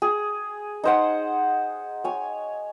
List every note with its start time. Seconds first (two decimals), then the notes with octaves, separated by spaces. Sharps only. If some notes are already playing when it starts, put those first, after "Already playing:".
0.02 G#4
0.84 D#4 C5 F#5
2.04 C#5 G#5